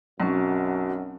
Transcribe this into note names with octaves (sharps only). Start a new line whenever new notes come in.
B1 F#2 C4 C#4 F#4